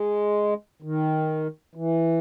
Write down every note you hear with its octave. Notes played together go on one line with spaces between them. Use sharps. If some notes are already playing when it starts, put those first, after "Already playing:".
Already playing: G#3
D#3
E3